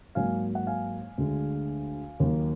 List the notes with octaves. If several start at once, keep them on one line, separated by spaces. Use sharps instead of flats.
G#2 F#3 A#3 F5 G#5
F#5
F5 G#5
D2 D3 G#3
D#2 D#3 F#3 A#3